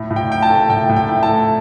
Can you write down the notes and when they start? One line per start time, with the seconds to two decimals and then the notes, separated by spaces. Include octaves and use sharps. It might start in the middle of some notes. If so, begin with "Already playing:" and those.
Already playing: A2
0.11 A2
0.16 G5
0.30 E4 G5
0.42 A5
0.50 A3
0.69 A2 G5
0.89 A2
0.96 G5
1.09 E4
1.23 A5
1.29 A3